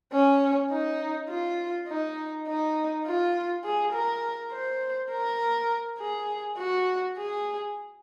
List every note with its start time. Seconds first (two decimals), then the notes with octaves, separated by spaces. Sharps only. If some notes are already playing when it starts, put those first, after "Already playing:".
0.13 C#4
0.71 D#4
1.29 F4
1.88 D#4
2.47 D#4
3.06 F4
3.64 G#4
3.93 A#4
4.52 C5
5.11 A#4
5.99 G#4
6.58 F#4
7.16 G#4